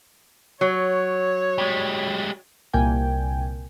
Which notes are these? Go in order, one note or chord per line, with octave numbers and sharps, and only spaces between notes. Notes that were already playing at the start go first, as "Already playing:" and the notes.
F#3 C#5
G3 G#3
C2 A#2 A#3 G5 G#5